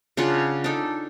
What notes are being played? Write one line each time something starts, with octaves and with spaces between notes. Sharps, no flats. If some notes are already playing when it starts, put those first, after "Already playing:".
C#3 D4 F4 F#5
D4 D#4 A4